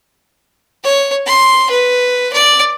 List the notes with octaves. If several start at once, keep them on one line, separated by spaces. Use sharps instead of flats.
C#5
C6
B4
D5